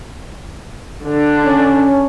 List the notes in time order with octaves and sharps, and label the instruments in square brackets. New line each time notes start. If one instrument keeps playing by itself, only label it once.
[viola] D3 D4
[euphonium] C#4